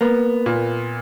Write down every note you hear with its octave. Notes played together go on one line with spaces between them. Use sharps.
A#3 B3
A#2